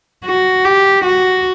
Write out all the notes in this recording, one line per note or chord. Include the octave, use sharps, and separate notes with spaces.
F#4
G4
F#4